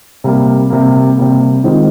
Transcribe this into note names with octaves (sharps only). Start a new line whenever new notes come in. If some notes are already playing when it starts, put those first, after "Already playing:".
C3 G3 A#3
C3 G3 A#3
C3 G3 A#3
D#3 G#3 C4 F4